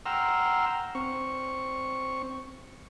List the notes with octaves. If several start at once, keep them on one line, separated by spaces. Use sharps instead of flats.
F#5 G5 A#5 C6 E6 F6
C4 C#6